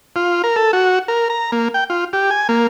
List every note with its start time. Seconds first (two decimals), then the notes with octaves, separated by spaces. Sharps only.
0.16 F4
0.44 A#4
0.56 A4
0.73 F#4
1.08 A#4
1.30 A#5
1.52 A#3
1.74 G5
1.90 F4
2.13 G4
2.31 G#5
2.49 A#3